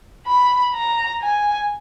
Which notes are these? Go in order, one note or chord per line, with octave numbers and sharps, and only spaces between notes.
B5
A#5
G#5